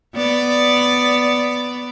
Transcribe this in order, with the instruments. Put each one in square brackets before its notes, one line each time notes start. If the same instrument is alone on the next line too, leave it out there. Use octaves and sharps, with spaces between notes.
[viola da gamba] B3 D5